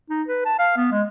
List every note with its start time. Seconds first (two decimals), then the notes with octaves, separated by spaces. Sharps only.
0.10 D#4
0.28 B4
0.45 A5
0.59 F5
0.77 B3
0.92 G#3